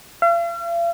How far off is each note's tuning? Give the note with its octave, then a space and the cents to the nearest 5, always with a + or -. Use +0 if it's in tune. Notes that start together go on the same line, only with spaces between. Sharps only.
F5 -45